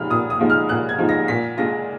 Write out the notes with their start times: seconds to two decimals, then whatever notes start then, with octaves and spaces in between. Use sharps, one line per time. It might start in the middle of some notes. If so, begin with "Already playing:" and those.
Already playing: A#2 F3 G#3 D#4 B5 F6
0.10 A#2 D#6
0.30 D#6
0.40 F3 G#3 D#4
0.50 F6
0.69 A#2 F#6
0.89 G#6
0.99 F3 G#3 D#4
1.09 A#6
1.28 A#2 B6
1.57 G#3 D4 F4 A#6